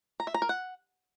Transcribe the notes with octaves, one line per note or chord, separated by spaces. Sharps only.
A#5
E5
A#5
A#4
F#5